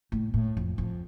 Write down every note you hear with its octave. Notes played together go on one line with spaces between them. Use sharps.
A2
A2
F2
F2